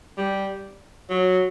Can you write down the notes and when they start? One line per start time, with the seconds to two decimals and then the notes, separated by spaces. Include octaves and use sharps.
0.18 G3
1.10 F#3